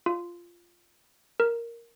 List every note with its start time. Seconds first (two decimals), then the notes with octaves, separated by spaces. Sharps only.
0.06 F4
1.40 A#4